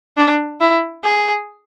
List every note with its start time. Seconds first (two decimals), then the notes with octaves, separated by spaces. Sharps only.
0.17 D4
0.61 E4
1.04 G#4